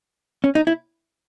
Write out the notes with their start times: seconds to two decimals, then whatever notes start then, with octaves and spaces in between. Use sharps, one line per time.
0.44 C#4
0.55 D#4
0.67 E4